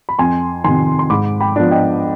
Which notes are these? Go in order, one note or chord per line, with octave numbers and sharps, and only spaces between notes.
B5
F2 G#5 C6
C3 D#3 G#5 C6
C6
G#2 B5 D6
G5 B5
F3 B3 D4
D#5 G5